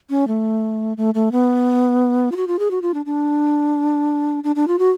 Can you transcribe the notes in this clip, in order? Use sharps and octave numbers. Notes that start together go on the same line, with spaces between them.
C#4
A3
A3
A3
B3
F4
F#4
F4
G#4
F#4
F4
D4
D4
D4
D4
F4
F#4